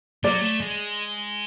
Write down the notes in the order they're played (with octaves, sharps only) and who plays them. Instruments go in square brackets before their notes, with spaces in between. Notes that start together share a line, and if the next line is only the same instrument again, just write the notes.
[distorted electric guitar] F#3 [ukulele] D5
[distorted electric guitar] A3
G#3